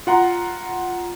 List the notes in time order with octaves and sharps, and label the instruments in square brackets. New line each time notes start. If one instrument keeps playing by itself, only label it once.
[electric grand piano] F4 F#5 A#5 C6